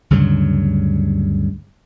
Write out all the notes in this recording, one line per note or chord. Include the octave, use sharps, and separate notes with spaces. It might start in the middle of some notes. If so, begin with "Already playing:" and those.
D2 G2 C#3 F#3